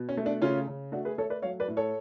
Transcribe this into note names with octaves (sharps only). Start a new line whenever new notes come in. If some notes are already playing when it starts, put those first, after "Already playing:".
Already playing: B2
C#4
A3
D4
C#3 C#4 F4
C#3
A3 D4 F#4
G#4 B4
A3 A4 C#5
B4 D5
F#3 C#5 F5
B4 D5
A2
A4 C#5